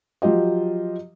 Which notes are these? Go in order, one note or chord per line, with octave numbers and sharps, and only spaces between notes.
F3 F#3 F4 G4 D#5